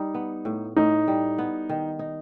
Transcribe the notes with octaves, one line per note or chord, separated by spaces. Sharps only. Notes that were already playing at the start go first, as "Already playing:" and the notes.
Already playing: G3 D#4
B3
A2
A2 D#4
G3
B3
D#3
D#4